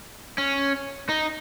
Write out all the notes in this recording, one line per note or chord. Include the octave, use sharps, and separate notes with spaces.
C#4
D#4